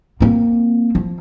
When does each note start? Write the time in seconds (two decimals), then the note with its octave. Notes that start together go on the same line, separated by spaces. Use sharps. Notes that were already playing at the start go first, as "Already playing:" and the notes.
0.20 A#3 C4
0.95 F3